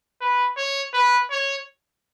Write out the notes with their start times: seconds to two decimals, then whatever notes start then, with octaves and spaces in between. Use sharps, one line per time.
0.21 B4
0.57 C#5
0.94 B4
1.31 C#5